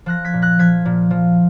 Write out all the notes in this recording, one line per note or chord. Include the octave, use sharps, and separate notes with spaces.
F3 F#6 A#6
G#6 B6
A#2
F#6 A#6
F3 G#6 B6
A#2
F3